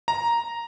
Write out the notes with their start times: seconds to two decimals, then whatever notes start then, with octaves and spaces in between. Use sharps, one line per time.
0.08 A#5